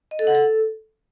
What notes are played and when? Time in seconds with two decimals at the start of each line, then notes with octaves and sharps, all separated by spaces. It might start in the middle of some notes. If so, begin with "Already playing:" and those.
0.11 D#5
0.19 A4
0.27 F#5
0.35 A4